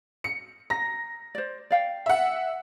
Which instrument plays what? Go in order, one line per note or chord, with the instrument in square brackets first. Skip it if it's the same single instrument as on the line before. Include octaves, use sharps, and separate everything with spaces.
[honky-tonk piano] C#7
[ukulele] A#5 [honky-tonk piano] A#6
[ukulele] C5 D5
D5 F5 G5
[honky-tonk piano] E5 F#5